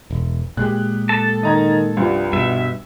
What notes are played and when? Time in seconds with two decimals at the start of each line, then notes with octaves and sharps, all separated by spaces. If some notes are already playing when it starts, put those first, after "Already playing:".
0.11 E1
0.57 A#2 G#3 G4 F#6
1.09 A4 A5
1.43 D#3 D#5 A#5 G#6
1.97 C2 G2 F3 G3
2.33 G2 B2 E5